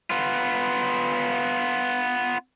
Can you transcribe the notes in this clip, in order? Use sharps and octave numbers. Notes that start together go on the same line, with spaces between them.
B3 F4